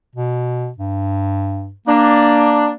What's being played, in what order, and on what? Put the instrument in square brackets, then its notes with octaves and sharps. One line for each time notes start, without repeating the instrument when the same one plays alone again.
[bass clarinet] B2
G2
[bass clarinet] A#3 [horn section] D4